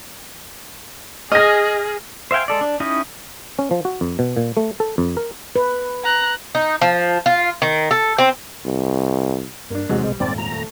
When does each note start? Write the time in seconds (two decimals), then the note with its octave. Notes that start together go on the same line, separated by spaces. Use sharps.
1.32 G#4 D#5 G#5 F6 A#6
2.31 C5 E5 F5 G5 G#5
2.48 G#3 A4 D5
2.61 D4
2.80 C#4 D#4 E4 G4 D#5
3.59 C#4
3.71 F3
3.85 F#4
4.01 F2
4.19 B2
4.37 A#2
4.57 A3
4.80 A4
4.98 F2
5.17 A#4
5.56 B4
6.04 A#5 F#6
6.55 D#4
6.81 F3
7.26 F4
7.62 D#3
7.91 A4
8.18 C4
8.65 C2
9.70 G2 A#3 D4
9.89 E2 G#2 C3 F#3 G#3
10.03 B1 G3
10.20 D#1 F2 G#2 C4 D5
10.38 G#1 A#5
10.52 A3